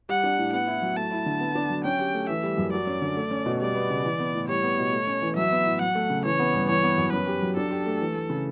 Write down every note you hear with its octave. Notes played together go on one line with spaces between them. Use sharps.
G3 F#5
D4
A2
B3 F#5
E4
F#3
A3 A5
E4
D3
B3
D4
F#3
C#4 G5
G4
A3
E3 E5
G3
F#2
F#3 D5
C#4
D3
A3
C#4
B2
G3 D5
B3
C#3
E3
B3
A2
G3 C#5
B3
B2
A3
C#4
E3
F#3 E5
B3
A2
F#3 F#5
A3
C#3
E3 C#5
B3
G2
E3 C#5
B3
F#2
C#4 B4
G4
F#3
D4 A4
G4
A3
E3
A3
C#3